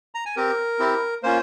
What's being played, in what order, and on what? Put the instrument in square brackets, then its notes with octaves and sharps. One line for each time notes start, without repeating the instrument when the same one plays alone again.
[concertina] A#5
G#5
C4 G4 A#4
C4 E4 G4
A#3 C#4 F4 C5